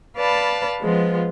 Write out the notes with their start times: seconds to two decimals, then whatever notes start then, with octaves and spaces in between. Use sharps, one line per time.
0.16 B4 D5 F5 A5 B5
0.81 F3 G#3 B3 F4